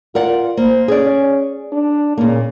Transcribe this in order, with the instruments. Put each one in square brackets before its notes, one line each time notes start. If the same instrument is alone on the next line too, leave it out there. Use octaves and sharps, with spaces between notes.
[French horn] F4 [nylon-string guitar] A#4 D5 F#5
[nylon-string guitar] A#3 [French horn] C5
[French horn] C#4 [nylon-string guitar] G#4 D5
[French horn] D4
[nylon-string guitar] A#2 A#3 [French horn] C#3